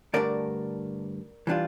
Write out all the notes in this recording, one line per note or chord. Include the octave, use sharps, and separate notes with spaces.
G2 D3 A3 D4 A#4 D5
E3 G3 D4 F4